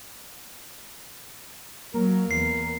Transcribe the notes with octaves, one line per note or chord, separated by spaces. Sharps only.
F#3 A#3 A#4
E2 C7